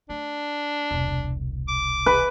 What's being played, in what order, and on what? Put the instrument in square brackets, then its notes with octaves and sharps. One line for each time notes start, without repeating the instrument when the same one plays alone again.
[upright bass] A3 [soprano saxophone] D4
[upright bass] E1 C2
[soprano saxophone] D6
[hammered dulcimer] B4